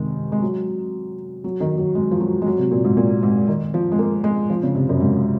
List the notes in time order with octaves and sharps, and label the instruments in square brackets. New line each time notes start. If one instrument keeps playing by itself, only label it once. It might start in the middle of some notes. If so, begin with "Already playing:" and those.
Already playing: [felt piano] C3 D#3 G#3
G#3
F#3
F#3
D#3
F#3
G#3
F3
F#3
G#3
F#3
C3
A#2
G#2
A#2
G#2
D#3
F3
G#3
A#3
G#3
F3
C#3
C3
F#2
G#2